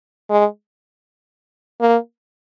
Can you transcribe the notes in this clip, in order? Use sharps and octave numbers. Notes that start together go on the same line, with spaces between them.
G#3
A#3